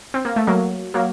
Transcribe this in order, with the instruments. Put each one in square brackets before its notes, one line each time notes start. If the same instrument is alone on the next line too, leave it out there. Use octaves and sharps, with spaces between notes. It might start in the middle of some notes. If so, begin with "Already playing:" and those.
[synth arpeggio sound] C4
A#3
A3
F#3 A#3
F#3 A#3